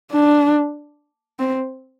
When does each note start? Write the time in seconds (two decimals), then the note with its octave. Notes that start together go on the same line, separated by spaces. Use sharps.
0.12 D4
1.39 C4